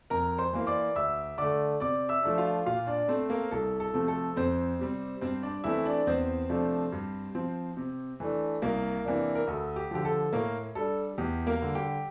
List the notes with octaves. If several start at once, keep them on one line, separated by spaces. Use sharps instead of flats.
F2 A#4 A#5
C5 C6
E3 A#3
D5 D6
D2 E5 E6
D3 A3 D5 D6
C3 D5 D6
E5 E6
F3 A3 D4
F4 F5
A#2 F4 F5
D4 D5
A3 C4 C5
A#3 A#4
C2 A4
A4
C3 F3 A3 C4
A4
F2 C4 C5
C3 G3 C4
G2 C4 C5
D4 D5
E3 A3 C4 E4 E5
D4 D5
E2 C4 C5
C3 F3 A3 D4
G2
F3 C4
C3
E3 A3 D4
C2 A#3 A#4
C3 E3 A#3 D4
A#4
D2 A4
G4
D3 F3 G4
A4
A2 A#3 A#4
G3 D4 A4
E2 G4
A#3 A#4
D3 G3
G4 G5